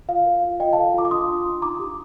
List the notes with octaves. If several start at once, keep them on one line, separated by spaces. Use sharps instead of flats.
F4 F5
A#4
F4
F4 D#5 G5
A4 F5 A5
F4 A#5 D6
D6
D4 C6 D#6
F4
D4
D#4 A#5 D6
G4